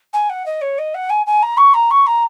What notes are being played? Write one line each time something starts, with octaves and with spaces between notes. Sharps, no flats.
G#5
F#5
D#5
C#5
D#5
F#5
G#5
G#5
A#5
C#6
A#5
C#6
A#5